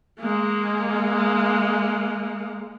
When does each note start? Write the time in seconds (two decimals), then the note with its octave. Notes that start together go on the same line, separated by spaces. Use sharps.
0.20 G#3 A#3